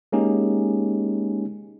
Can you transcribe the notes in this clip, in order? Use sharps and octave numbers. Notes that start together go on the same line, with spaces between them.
G#3 A#3 C#4 D#4 G4 G#4